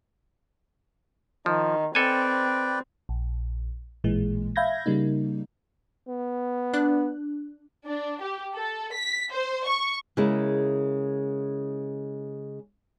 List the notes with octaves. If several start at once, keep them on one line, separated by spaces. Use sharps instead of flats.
D#3 F3
C4 A4 B4 D5 G5 G#5
A#1
A1 A#2 E3 G#3
E5 F5 B5 G6 G#6 A#6
C#3 G3 A#3 D#4
B3
D4 F#6
D4
G4
A4
B6
C5
C#6
C#3 G#3 A#3 E4